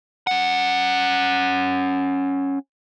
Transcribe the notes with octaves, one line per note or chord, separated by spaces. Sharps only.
C#4 F#5